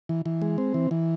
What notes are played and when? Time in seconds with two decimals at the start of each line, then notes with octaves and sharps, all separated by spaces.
0.09 E3
0.26 E3
0.42 G#3
0.58 C4
0.74 E3
0.91 E3